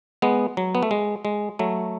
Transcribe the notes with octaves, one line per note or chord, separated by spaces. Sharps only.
G#3 B3
F#3
B3
A3
G#3
G#3
F#3 A3